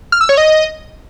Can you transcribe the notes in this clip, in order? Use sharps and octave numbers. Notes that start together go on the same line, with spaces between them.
F6
E6
C#5
D#5